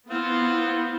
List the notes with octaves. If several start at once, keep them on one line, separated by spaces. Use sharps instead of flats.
B3 C4 E4 F4 C5